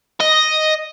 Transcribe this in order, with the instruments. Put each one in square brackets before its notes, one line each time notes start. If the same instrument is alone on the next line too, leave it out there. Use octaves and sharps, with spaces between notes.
[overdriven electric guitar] D#5